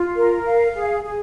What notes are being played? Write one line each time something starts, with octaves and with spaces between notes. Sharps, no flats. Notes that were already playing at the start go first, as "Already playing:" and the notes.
Already playing: F4
A#4
F5
G#4
G#4